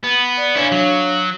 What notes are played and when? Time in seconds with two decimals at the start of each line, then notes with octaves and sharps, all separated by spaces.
0.03 B3
0.37 D5
0.56 C#4 D4 E4 C#5 F5
0.72 F#3